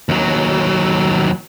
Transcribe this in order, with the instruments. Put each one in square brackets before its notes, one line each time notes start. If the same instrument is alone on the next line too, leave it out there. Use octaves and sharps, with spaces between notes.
[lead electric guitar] D#2 F#3